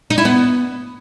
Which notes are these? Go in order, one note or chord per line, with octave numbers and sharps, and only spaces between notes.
D#4
E4
B3